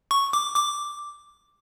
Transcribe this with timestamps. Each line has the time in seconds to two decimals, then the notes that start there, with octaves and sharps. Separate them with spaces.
0.11 C#6
0.33 D6
0.56 D6